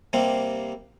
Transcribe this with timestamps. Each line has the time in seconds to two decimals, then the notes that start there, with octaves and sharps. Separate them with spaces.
0.13 C3 G3 A#3 C4